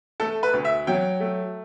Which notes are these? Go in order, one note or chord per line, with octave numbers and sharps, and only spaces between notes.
A3 A4
B4
D2
E5
F#3 G5
A3